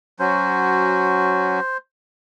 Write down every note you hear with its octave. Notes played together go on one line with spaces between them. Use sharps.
F#3 C#4 F#4 C5